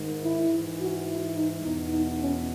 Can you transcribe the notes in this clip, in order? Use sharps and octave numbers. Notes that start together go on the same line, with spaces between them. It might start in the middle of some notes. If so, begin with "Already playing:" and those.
Already playing: G#2 D#3
E4
G#2 E3
F#4
E4
D#4
E2 B2 D#4
D#4
C#4